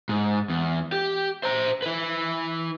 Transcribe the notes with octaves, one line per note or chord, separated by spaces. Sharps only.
G#2
E2
G4
C5 A#5
E4 B4